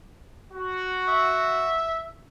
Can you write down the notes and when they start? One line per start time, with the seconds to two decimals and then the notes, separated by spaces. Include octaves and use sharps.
0.52 F#4
1.08 E5